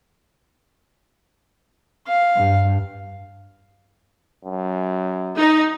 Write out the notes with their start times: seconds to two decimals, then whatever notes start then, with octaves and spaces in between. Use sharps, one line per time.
2.07 F5
2.36 G2
4.45 F#2
5.37 D#4